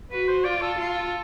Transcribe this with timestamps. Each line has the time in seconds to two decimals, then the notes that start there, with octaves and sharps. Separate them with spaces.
0.11 F#4 B4
0.28 C5
0.44 F4 D5
0.61 A4
0.78 F4